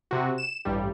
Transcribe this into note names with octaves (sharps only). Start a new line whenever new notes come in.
C3 F#4
E7
A1 G2 G3